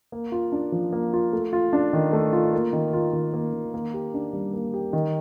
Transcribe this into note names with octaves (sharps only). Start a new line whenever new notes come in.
A#3
F4
D4
F3
A#3
F4
A3
F4
D4
D#3
A3
F4
A#3
D#3
F4
D#3
A#3
D#3
A#3
G4
D4
G3
A#3
G4
D#3